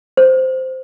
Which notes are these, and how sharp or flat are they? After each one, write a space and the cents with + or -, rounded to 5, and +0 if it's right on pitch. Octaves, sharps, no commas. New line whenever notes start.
C5 -10